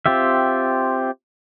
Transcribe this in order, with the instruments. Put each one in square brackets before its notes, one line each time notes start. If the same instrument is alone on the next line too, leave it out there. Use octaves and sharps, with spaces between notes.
[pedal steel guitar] C4 F4 G4 E5